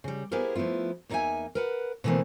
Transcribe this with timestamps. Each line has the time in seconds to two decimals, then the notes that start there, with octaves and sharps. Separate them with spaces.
0.04 C#3 G3
0.31 B3 E4 G4 G#4 A#4 C5
0.55 F3 A3 B3 E4 F4
1.09 E2 A#3 D#4 C#5 E5 G#5
1.55 A#4 B4 F#5
2.04 B2 D3 E3 A3 A#3 C4